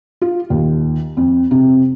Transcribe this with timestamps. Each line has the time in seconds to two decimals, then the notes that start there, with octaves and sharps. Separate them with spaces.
0.22 F4
0.50 D#2
1.17 F2
1.51 C3